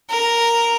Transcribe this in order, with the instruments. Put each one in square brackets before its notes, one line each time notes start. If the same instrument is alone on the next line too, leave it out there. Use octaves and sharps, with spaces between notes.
[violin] A#4